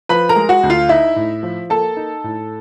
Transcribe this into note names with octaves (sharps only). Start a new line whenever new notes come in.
F3 B4 B5
A#4 A#5
G#3
F#4 F#5
D2
F4 F5
D#4 E4 E5
A2
F3
A#3 A4 A5
D#4
A2